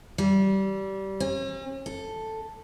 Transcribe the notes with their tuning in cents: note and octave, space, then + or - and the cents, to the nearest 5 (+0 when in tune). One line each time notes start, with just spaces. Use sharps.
G3 -20
C#4 -45
A4 +5